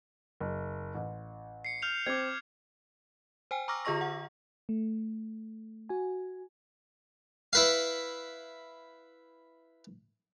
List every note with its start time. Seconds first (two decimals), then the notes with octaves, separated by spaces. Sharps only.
0.40 F#1
0.95 A1
1.65 C7 C#7
1.82 F6 G6 F7
2.06 C4 D6 G#6
3.51 C5 G5 G#5
3.68 A#5 C#6 D6 E6 F6 A#6
3.85 D3 F4 G#4 D#5 C#6 A#6
4.01 F#5
4.69 A3
5.89 F#4 G#5
7.53 E4 B4 F5